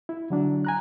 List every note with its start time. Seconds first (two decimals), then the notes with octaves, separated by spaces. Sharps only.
0.09 E4
0.30 D3 F#3 D4
0.65 G#5 A#5 F#6